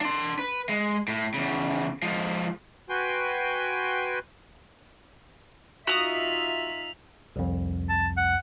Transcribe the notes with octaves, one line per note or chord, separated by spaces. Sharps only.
D4 C6
B4
G#3
A2
E2 C#3
F3 G#3
F#4 B4 G5 G#5 C6
D#4 F4 F#4 E5 D#6 B6 F7 F#7
C2 F2
A5
F#5